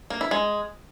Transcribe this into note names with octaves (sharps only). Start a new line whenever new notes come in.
A#3
E4
G#3